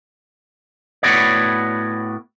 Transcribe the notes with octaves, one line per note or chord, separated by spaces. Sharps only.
A2 B3 F#4 C#5 D5